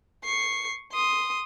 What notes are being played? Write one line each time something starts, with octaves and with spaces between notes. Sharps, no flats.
C#6 C7
C6 D#6